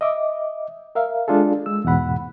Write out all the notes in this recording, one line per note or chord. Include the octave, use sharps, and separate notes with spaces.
D#5 E5 D6
A#4 E5 F5
G#3 D4 F4 G#4 A4
G#3 E6
E2 G#2 B2 F#5 B5